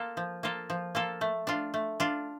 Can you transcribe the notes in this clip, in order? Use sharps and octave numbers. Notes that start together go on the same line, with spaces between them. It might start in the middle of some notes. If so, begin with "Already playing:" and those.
Already playing: A#3 F4 A4
F3
A#3 F4 A4
F3
A#3 F4 A4
A3
D4 F4
A3
D4 F4